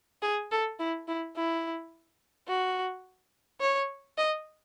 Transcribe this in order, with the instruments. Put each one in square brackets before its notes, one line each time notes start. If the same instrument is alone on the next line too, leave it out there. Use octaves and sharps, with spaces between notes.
[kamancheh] G#4
A4
E4
E4
E4
F#4
C#5
D#5